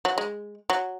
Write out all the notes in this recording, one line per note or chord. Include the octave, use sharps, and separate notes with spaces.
F#3
G#3
F#3